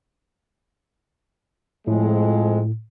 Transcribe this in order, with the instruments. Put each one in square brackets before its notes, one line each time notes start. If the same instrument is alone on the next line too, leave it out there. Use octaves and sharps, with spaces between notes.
[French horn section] F2 F3 G#3 [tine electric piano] A2